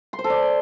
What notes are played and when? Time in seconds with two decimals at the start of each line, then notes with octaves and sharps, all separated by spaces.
0.13 C6
0.19 C5
0.24 A4
0.30 D5